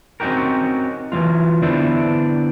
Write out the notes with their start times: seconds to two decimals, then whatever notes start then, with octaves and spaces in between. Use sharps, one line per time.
0.20 C4 C#4 D#4 F#4 G4 A#4
1.12 E3 F#3 G#3 F4
1.62 D3 B3 D4 E4 C5